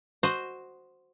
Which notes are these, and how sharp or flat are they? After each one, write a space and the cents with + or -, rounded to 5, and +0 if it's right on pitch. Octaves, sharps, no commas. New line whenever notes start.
F#4 +0 C5 +0 D#5 -10